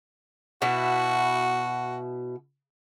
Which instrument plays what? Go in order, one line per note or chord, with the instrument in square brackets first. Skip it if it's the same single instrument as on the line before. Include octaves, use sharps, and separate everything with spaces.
[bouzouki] B2 E4 [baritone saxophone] F#4